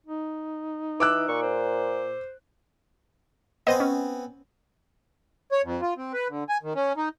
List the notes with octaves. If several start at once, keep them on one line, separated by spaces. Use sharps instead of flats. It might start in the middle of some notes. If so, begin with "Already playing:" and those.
D#4
E3 D6 E6 F#6
A#2 C#6
C5
B3 C4 C5 D#5 G#5
C#4
C#5
F2
F4
C4
B4
D3
G#5
D#3
C#4
D#4